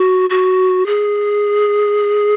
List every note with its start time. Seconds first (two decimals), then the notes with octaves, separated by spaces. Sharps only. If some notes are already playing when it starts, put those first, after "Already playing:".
Already playing: F#4
0.30 F#4
0.86 G#4